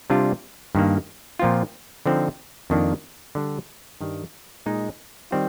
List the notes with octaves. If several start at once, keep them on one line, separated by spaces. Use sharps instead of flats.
C3 G3 D4 F4
G2 D#3 A#3
A#2 F3 C4 F4
D3 F3 C4 D#4
F2 D#3 A#3 D4
D3 G3 D4
G2 D#3 G3
A#2 G#3 D#4
D#3 G3 C4 F4